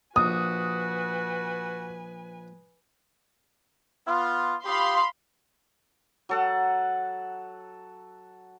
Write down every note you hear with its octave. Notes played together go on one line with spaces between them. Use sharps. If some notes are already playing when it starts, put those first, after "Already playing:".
A#1 F#4 B4 G#5 D#6
B3 F4
F4 G4 F5 B5 C6 D#6
F#3 A4 F#5